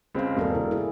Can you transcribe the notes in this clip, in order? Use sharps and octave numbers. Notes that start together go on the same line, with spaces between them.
C#2 C4 G#4 F5
E1 A#3 A4 A#4
C#3 E4
E4 G#4